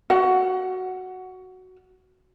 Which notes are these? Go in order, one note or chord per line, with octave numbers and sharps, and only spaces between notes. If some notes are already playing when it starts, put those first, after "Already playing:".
F#4 F#5